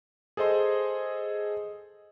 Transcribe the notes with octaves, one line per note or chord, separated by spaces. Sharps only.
G#4 A4 C5 D#5 C6